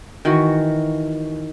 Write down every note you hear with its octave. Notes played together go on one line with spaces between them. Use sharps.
D#3 E3 F#4